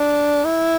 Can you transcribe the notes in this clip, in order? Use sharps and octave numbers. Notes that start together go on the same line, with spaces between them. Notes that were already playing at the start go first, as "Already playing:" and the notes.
Already playing: D4
E4